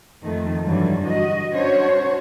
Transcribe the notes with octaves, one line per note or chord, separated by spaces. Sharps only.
F2 D#3 A3
G2 D3 E3 F#3
F#4 D#5
C#4 D4 F#4 C5 C#5